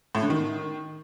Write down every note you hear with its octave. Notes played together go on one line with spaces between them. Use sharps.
A2
D3
D#3